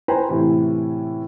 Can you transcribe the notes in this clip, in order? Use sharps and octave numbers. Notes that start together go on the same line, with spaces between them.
B4 C5 G5 G#5 A#5 B5
A2 C3 E3